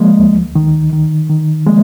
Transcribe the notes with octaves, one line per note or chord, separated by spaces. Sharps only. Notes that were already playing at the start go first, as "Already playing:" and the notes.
Already playing: F3 G#3 A#3
D2
D#3
D#3
D#3
F3 G#3 A#3